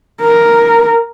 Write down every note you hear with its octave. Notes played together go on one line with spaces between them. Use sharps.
A#4